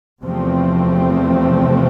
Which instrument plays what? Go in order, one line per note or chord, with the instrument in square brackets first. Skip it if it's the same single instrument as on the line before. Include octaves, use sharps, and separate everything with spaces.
[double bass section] E2 C3 F3 A3 C4